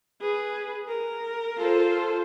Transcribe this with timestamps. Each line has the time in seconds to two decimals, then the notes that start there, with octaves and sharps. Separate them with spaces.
0.21 G#4 B4
0.87 A#4
1.59 F4 A4 C5